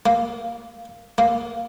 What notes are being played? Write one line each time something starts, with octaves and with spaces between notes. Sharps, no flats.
A#3
A#3